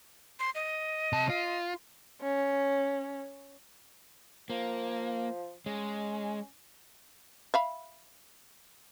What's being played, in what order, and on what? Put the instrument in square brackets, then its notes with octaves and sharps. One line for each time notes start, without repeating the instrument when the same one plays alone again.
[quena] C6
D#5
[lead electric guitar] C3 A5
F4
[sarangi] C#4
[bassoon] F3 [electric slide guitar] A#3
[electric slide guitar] G#3 [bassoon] C#4
[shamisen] E5 F5 B5